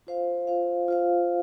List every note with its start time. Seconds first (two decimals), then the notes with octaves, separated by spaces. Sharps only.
0.07 F4 C5 F5
0.47 F4 C5 F5
0.88 F4 C5 F5